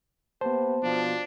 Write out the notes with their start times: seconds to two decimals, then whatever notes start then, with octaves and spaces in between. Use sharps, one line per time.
0.41 A#3 B3 G4 B4 C5 A5
0.83 B2 F3 D4